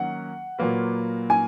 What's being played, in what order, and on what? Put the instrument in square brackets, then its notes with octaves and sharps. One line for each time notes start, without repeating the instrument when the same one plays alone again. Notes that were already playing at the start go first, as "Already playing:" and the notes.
Already playing: [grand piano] D#3 F#3 A#3 C#4 [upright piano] F#5
[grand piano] A#2 F#3 A#3 F4 B4
[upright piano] G#5